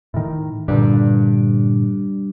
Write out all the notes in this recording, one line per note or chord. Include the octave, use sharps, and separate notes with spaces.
A2 D#3
G2 A#2 D3 G3 D4